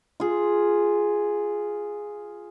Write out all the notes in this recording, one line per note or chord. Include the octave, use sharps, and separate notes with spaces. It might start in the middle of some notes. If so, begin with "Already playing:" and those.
F4 G#4